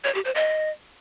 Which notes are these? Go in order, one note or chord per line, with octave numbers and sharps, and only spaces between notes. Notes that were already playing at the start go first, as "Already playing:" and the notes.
C#5
G4
C5
D#5